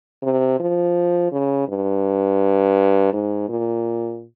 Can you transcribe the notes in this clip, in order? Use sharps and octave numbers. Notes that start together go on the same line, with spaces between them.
C3
F3
C#3
G2
G#2
A#2